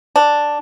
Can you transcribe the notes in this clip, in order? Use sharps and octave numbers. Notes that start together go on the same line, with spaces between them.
D4